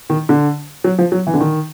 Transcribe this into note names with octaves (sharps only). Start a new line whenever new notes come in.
D#3
D3
F#3
F3
F#3
E3
D3
D#3